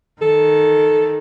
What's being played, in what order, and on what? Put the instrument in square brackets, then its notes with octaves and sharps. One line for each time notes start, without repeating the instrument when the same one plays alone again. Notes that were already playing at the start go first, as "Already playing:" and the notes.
[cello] D#3 [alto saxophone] A4